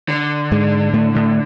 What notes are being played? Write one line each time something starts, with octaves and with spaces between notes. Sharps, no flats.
D3
G#2 G#3
A2 A3
A2 A3